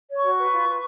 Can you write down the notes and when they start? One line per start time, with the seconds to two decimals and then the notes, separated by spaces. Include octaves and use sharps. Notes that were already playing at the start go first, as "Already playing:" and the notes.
0.08 C#5
0.16 C#6
0.24 F#4
0.37 B4
0.52 F4
0.67 B4